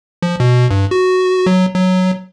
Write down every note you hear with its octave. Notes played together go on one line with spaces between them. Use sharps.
F3
B2
G2
F#4
F#3
F#3